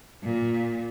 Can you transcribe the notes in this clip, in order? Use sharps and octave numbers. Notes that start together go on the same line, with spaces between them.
A#2